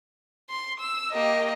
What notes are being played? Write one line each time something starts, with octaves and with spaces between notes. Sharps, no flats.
C6
E6
A#3 G4 D#5